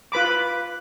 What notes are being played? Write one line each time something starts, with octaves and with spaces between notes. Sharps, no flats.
F4 B4 B5 D6